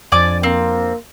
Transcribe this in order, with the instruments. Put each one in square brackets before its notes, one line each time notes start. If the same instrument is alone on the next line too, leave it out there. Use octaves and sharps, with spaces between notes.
[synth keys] F2 F3 D4 [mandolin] D5 G#5 D6
[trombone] A#3 [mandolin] C4